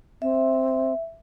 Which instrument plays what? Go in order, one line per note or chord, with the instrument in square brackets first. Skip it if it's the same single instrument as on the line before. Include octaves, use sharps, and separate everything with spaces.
[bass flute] C4 [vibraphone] E5